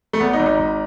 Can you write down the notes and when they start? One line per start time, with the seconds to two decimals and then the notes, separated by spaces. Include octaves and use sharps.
0.13 A3
0.20 G#1 B3
0.33 D#4
0.39 G#1
0.46 D#4
0.59 G#1